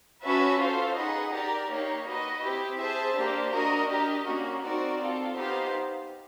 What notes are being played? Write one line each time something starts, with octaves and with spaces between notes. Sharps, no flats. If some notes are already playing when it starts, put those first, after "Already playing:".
C#4 F#4 B4 E5 A5
F4 A4 C5 F5
D#4 G#4 B4 D#5 F#5
G4 A#4 D5
A#3 D#4 G4 A#4 C#5
F#4 B4 D#5
C4 E4 G4
G#4 C5 E5 A5
A#3 D4 G4 C5
D4 F#4 A#4 D#5
D4 G4 A#4 D#5
A#3 C#4 F#4
C4 D#4 F#4 A#4 D5
C4 F4 A4
B3 D#4 G4 C5 F5